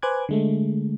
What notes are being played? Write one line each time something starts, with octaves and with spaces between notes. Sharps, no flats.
B4 C5 G#5 D6 F#6 G#6
D3 G#3 A3